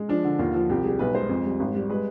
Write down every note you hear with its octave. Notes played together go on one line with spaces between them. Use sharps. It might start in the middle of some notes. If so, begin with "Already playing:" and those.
Already playing: G#3
F3 D4
D3
D#2 F4
F3
C2 G4
G3 G#4
B1 B4
G#3 C5
F2
G3
G#1
G3
G#3 B4